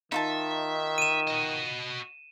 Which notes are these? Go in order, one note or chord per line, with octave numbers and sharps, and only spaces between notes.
D#3 D#4 F4 E5 A5
D#7 E7
F#4 D#5